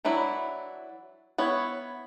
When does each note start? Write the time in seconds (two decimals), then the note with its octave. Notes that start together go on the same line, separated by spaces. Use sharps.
0.05 E3 F#3 D4 E4
1.38 B3 E4 C#5